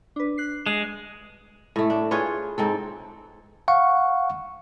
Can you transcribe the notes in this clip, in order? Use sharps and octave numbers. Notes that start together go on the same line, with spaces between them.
D4 B4
F#6 C7
G#3 C7
A2 A3
D4
F4 G#4 B4 C#5
G#2 C4 A4
F5 F#5 C#6